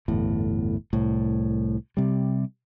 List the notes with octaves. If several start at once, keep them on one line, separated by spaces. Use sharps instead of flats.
G1 E2 A2
C2 A2
C3 G3